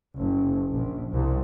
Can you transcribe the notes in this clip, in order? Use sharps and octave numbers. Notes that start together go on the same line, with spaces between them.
F#1
A#1
C2